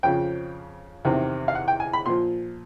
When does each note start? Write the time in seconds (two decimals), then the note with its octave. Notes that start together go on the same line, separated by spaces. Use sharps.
0.03 F2 C#3 F3 G5
1.05 E2 C3 D#3
1.48 F5
1.55 F#5
1.68 G5
1.80 G#5
1.93 B5
2.06 A#2 F3 C6